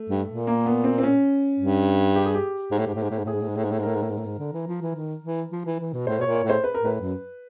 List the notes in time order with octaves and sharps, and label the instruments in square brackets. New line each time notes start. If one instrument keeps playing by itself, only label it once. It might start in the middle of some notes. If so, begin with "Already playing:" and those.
Already playing: [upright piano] A3
[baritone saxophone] G2
A#2
[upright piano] A#3
B3
C4
C4
C#4
[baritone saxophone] G2
[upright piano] G4
G#4
G4
[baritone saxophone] G#2
A2
G#2
A2
G#2
A2
G#2
[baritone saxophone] A2 [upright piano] G#4
[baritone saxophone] G#2
A2
G#2
A2
G#2
A2
G#2
[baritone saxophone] A2 [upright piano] A#4
[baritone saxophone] G#2
A2
G#2
A2
G#2
D3
E3
F3
E3
D#3
E3
F3
E3
E3
B2
[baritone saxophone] A2 [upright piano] C5
[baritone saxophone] B2 [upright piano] C#5
[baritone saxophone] A#2
[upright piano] C#5
[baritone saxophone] A2
[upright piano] C5
B4
A#4
[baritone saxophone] A2 [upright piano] B4
[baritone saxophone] F#2